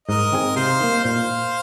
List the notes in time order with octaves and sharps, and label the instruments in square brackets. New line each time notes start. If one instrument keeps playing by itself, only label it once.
[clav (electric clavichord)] G#2 [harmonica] A#4 D#5
[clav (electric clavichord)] D#3 C4 G#4
[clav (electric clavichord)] C3 [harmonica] C5 F5
[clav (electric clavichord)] D#3 A#3
[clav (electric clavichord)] A#2 [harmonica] C5 F5